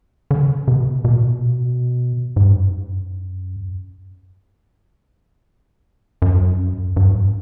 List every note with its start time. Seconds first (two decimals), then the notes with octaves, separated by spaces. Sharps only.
0.31 D3
0.39 C#3
0.49 C3
0.57 C#3
0.68 C3
1.05 B2
1.13 A#2
1.22 B2
2.36 G#2
2.44 G2
2.53 F#2
6.22 F#2
6.96 G2
7.10 G#2